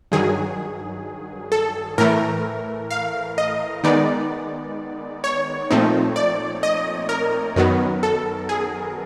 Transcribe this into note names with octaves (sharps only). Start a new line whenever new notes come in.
G2 D#3 F#3 G#4
A4
A2 E3 A3 A#4
F5
D#5
D#3 G#3 B3 D#4 D5
C#5
A#2 F3 A3 C4 D#4
D5
D#5
A#4
F#2 D#3 F#3 B3
A4
G#4